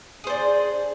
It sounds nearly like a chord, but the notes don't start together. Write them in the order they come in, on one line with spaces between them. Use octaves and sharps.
G#4 C5 D4